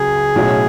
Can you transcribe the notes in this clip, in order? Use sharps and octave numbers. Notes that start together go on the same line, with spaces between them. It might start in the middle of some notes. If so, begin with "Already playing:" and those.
Already playing: C#2 C#3 F#3 G#4
B1 A2 F#3 C#4